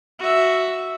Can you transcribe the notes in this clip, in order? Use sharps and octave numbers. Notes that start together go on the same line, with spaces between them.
F#4 E5